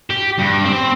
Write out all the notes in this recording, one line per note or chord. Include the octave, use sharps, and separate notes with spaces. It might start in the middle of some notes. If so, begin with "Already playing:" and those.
G4
G2
C4